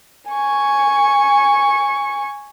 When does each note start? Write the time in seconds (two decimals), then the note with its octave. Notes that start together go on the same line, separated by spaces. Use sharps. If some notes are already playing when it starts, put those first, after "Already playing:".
0.30 G#5 C#6